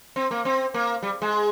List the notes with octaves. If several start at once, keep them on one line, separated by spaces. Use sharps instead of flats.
C4
A#3
C4
A#3
G3
G#3